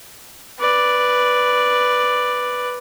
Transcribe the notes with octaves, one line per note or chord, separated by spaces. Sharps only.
B4 D5